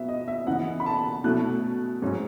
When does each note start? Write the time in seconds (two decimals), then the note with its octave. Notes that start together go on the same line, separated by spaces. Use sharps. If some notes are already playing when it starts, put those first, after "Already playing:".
Already playing: B2 F#3 B3 E5
0.09 D#5
0.28 E5
0.47 C#3 E3 B3 D#4 F#5
0.80 B5
0.86 A5
1.24 B2 F#3 A3 C#4 F#6
2.02 G#2 F#3 C#4